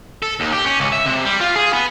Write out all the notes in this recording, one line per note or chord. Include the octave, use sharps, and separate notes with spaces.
A4
D#2
G4
C#4
C#2
E5
C3
G3
F4
G#4
B3